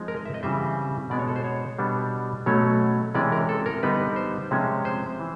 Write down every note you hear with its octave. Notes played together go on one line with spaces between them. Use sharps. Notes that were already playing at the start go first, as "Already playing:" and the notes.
Already playing: F3 G#3 C4 D#4
A#4
D#5
E5
D#5
C#3 E3 G3 C4 E5
B2 G#3 B3 D4 D5
C#5
A4
C5
C#5
B2 G3 B3 D4
B2 F#3 A3 C#4 C#5
C3 E3 G#3 C#4 D5
A#4
A4
A#4
D3 G3 B3 D#4 B4
C5
C3 F3 G#3 C#4
C5
E3